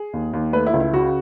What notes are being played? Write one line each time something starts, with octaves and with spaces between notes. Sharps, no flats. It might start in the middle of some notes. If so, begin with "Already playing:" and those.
Already playing: G#4
D#2
D#2
A3 B4
E4
C#2
E4
C#3 F#4